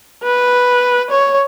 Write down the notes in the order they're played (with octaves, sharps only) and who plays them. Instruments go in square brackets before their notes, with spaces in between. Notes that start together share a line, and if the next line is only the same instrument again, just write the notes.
[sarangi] B4
C#5